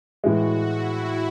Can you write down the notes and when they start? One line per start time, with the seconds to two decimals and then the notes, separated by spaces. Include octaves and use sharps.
0.23 A2 E3 G#3 F#4
0.66 E4